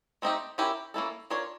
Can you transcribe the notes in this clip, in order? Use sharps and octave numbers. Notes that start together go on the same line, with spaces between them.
A3 C4 D#4 G4
C#4 E4 G4 A#4
A#3 C#4 E4 A4
D4 F4 A#4 C#5